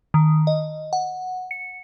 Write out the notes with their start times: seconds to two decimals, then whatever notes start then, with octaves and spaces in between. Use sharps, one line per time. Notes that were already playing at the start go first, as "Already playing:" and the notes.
0.14 D#3
0.47 D#5
0.93 F#5
1.51 C#7